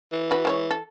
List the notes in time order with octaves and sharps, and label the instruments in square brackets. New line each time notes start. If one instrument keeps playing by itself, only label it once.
[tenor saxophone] E3
[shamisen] F#4 B4
G#3 C5 C#5
A4